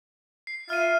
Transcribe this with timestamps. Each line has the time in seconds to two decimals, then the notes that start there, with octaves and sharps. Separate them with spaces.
0.47 C7
0.70 F4 E5 F6 D#7